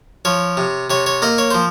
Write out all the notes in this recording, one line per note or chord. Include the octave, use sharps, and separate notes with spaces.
F3 C#5
C3
C3 C#5
C#5
A#3 D#5
C#5
F3 C5